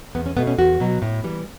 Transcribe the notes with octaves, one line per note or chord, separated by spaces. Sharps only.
E2 B3
C#4
B2 A3 B3
C#4
E2 F#4
B2 F#3
A2
E3 G3